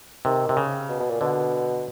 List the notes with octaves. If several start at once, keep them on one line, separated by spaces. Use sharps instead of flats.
C3 D#3
C3
C#3
B2
B2
A#2
B2 D3